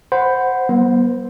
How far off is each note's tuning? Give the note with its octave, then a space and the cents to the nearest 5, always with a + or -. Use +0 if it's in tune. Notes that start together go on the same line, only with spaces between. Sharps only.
C5 +0 F#5 +0 B5 +10
G3 -45 B3 -40